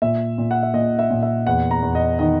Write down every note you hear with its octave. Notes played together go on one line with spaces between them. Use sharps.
A#2 E5
A#2
F#5
E5
A#2 D#5
E5
A#2
E5
E2 F#5
A#5
E2
D#5
D#3 D#5